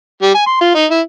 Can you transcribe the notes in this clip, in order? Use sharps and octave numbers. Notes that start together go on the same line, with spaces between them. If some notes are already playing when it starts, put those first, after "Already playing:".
G3
G#5
C6
F4
D#4
E4